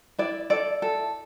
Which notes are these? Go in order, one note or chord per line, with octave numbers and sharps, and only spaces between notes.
E4 D5
A4 D5
A4